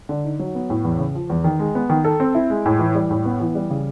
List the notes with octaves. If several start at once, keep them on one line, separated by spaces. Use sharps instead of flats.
D3
D#4
F#3
B3
A2
E2
C#3
F3
E2
D#3
G#3
B3
D#3
A4
C4
E4
G#3
A2
E3
G3
A2
B3
E3
G3
C#3